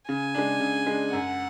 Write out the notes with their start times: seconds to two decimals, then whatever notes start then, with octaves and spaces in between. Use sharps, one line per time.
0.08 C#3 G#5
0.35 G#3 D4
0.60 C#3
0.87 G#3 D4
1.13 F#2 F#5